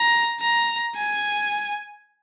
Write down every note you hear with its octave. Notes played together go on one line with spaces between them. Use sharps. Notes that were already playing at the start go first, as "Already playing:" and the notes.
Already playing: A#5
A#5
G#5